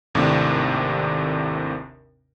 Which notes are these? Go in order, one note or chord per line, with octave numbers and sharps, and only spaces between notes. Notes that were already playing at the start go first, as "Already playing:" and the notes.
G#1 D#2 A2 C3 D4